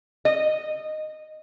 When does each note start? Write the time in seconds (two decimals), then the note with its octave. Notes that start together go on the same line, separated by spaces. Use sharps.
0.25 D#5